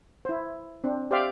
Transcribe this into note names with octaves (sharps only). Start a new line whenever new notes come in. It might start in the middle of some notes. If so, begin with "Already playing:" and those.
E4 C5
C4 D4
G4 C5 D5 E5 F5 G5